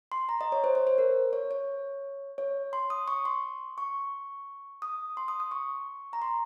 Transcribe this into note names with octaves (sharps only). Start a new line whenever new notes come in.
C6
A#5
D#5
C#5
C5
C#5
C5
A#4
C#5
C#5
C#5
C6
D#6
C#6
C6
C#6
D#6
C6
D#6
D#6
C#6
A#5
C6